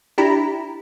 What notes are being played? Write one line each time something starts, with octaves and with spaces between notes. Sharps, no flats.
D4 E4 G4 A#5 B5